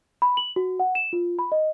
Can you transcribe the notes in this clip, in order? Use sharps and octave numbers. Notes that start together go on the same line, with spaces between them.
B5
F#7
F#4
F#5
E7
F4
B5
D#5